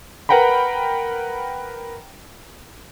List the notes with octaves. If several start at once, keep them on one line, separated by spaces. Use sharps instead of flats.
A#4 B4 F#5 G5 A#5 B5